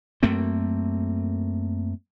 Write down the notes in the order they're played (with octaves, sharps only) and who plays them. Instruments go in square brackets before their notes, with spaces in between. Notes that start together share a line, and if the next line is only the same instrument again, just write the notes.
[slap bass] F#2 A3 A#3 C4